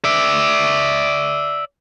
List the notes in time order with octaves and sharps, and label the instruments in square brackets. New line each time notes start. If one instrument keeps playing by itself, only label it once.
[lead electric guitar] D5 E5